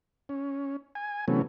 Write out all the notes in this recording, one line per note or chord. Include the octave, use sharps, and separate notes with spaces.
C#4
G#5
C3 E3 F#3 A3 B3 C#4